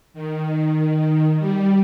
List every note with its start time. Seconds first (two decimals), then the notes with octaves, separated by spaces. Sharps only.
0.14 D#3
1.39 G3